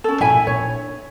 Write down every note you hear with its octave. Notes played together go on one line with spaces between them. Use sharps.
C#4 A4
A#2 E4 E5 G#5
D4 C#5